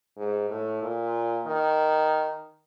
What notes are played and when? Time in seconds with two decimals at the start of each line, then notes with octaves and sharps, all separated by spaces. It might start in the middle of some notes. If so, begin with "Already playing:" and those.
0.17 G#2
0.49 A2
0.82 A#2
1.46 D#3